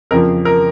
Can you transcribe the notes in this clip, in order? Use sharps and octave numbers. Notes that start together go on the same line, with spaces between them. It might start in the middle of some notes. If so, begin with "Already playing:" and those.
F2 C#3 F3 A#4
A#4